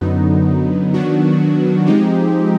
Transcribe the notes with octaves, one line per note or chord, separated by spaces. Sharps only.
F#2 D3 F#3 B3 D#4
D#3 F#3 B3 D4 F#4
F3 G#3 C4 D#4 G4